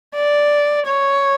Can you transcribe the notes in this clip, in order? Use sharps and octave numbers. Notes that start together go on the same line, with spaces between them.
D5
C#5